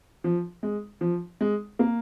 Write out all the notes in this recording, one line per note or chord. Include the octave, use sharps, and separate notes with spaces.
F3
G#3
F3
G#3
A#3